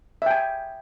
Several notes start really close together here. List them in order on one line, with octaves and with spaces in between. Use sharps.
E5 G5 G#5